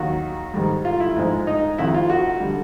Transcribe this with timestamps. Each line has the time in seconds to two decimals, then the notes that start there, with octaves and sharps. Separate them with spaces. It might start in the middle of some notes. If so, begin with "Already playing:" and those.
Already playing: D#2 D#3 F#3 F#4
0.54 G#2 D#3 G3
0.85 F4
1.00 E4
1.16 G#2 F3 G#3
1.47 D#4
1.78 F2 C3 D#3 E4
1.94 F4
2.10 F#4
2.40 D3 G3